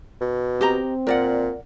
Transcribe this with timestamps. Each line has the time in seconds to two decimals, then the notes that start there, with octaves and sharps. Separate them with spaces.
0.21 B2
0.61 C4 G4 D#5 A#5
1.07 A#2 A#4 D5 F#5